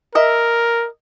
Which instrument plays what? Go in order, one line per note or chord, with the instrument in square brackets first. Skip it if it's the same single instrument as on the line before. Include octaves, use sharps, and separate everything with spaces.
[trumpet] A#4 [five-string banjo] D#5 E5